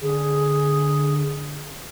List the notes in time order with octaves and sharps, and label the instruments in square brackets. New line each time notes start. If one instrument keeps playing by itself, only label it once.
[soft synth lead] D3 [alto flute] G#4